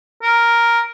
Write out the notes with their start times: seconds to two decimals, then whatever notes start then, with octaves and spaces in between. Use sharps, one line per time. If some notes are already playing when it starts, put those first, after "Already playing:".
0.22 A#4